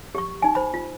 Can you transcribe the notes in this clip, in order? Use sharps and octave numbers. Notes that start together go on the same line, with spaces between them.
G4 C#6
D#4 G#5
C5 B5
F4